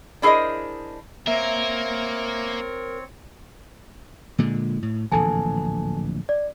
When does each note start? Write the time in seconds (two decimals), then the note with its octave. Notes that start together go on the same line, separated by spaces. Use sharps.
0.22 D4 E4 G#4 A#4 C5 D#5
1.27 A#3 C4 A#4 C#5 E5
4.38 A#2 D3 G#3
4.83 A2
5.12 D1 A#1 E3 A4 G#5 A5
6.29 D5